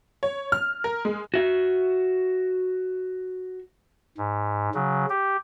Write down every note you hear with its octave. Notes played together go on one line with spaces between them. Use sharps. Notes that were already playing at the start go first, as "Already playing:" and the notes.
C#5
F6
A#4
G#3
F#4 E5
G#2
C#3 F#3
G4